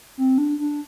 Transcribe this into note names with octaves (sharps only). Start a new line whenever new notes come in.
C4
D4
D4